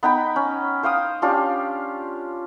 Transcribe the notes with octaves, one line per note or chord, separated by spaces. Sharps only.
B3 D#4 G5 B5
C#4
C5 F5 G5 D#6
C#4 D4 F4 G4